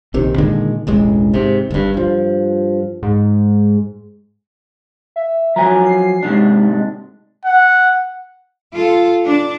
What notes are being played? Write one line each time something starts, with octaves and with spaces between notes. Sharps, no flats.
A#1 C3 D#3
A#2 D3 D#3 G#3
E1 A1 G#3
G#2 C3
G1 G2
G2 F3
G#2
E5
F3 F#3 G#5 A#5
C7
G#2 C3 D4
G#3
F#5
F4 A4
D4